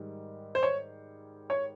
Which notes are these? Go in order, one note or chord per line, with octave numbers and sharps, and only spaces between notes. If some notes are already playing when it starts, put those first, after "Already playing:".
Already playing: G#2 D#3 G3
C5
C#5
C#5